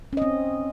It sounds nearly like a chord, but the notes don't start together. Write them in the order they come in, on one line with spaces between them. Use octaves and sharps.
C#4 D#5 C4